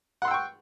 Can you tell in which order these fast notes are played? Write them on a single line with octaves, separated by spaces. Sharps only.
F#5 C6 E6 G5 C#6